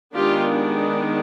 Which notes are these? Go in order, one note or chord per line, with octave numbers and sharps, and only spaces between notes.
D#3 G#3 B3 D4 F4 G4